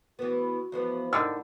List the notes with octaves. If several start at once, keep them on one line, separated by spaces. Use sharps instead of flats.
E3 B3 F#4
E2 F3 B3
G#2 D3 D#3 E6